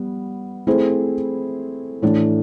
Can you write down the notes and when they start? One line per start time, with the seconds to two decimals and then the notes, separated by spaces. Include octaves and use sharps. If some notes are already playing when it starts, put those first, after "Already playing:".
Already playing: G3 B3
0.67 A3 C4 E4 G#4 C5
2.02 A2 E3 A3 D4